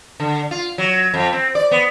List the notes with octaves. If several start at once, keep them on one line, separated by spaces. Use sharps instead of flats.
D3
F4
F#3
F2
C4
D5
B3